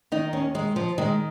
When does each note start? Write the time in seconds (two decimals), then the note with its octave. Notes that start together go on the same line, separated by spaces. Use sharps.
0.12 D#3 D#4
0.33 D#2 C#4
0.55 D#3 G#3
0.75 D#2 F3
0.98 D#3 G#3